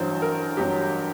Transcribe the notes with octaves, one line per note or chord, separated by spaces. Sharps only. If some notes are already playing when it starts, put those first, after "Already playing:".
Already playing: A1 G2 F#3 C5
A#4
A1 G2 F#3 G4